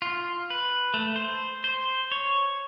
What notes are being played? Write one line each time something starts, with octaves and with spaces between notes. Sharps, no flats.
F4
B4
A3
C5
C5
C#5